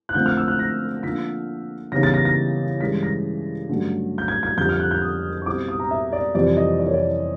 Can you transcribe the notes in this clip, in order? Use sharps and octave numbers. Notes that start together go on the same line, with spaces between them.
F#6
D3 F3 A3 C4 G6
F6
E6
F#6
A#6
D3 F3 A#3 D4 B6
C#3 E3 G3 B3 D#4 A#6
A6
A#6
A#6
G2 E3 G#3 C#4 B6
A#6
G2 D3 F#3 A3 C#4
G6
G#6
G#6
F2 D3 G3 G6
F6
F#6
G6
D#6
C#6
B2 G3 C4 E4 D6
D#6
A#5
E5
D5
F2 C3 E3 G3 C4 D5
D#5
D5
C#5
D5